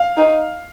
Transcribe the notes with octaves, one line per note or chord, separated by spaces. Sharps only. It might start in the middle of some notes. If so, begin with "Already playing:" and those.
Already playing: F5
D#4